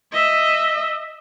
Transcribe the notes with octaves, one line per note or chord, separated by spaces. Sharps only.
D#5 E5